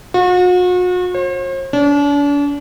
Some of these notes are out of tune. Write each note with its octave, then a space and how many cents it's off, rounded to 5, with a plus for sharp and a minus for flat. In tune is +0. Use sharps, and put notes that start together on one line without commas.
F#4 -40
C5 +45
D4 -40